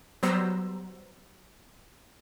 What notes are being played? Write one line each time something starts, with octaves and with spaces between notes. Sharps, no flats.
F#3 G3 B3 C5 A#5 E6